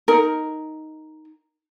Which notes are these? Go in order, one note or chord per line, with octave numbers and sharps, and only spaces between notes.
D#4 A#4